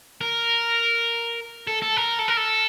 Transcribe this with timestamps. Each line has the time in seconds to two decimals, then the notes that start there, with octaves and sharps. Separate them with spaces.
0.21 A#4
1.67 A4
1.82 A4
1.97 A#4
2.19 A4
2.28 A#4
2.37 A4